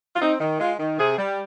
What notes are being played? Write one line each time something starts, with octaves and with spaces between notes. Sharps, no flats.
F4
C4 D#4
D#3
G#3 F4
D#3
C3 G#4
G3